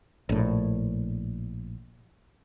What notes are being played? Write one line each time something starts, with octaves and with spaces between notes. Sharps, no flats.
A#1 A2